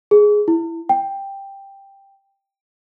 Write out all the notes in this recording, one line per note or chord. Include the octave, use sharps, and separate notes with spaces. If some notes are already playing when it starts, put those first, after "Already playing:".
G#4
E4
G5